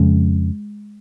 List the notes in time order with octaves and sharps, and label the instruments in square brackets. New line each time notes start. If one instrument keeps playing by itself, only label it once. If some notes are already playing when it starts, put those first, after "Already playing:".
Already playing: [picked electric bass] F2 C#3 G#3